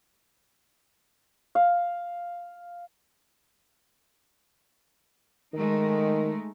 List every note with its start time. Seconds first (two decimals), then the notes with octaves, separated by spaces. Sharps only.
1.55 F5
5.54 D#3 G#3 A3 D#4